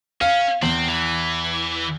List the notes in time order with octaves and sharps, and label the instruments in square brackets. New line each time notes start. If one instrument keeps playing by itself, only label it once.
[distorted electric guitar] C#4 [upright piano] F5
[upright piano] E2 F#7 [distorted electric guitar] C4
[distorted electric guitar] E3